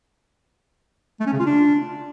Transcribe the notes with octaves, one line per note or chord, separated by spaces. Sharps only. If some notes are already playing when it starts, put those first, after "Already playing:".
A3
C#4
C#3
F4
D4